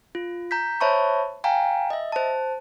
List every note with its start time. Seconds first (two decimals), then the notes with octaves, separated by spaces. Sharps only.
0.15 F4
0.51 A#5 G6 B6
0.80 C5 C#5 E5 A5 B5 C#6
1.44 F5 G5 G#5 A#5
1.90 D#5 E5
2.12 C5 A5